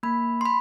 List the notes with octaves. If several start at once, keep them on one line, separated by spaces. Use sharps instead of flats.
A#3 B5
C6
B5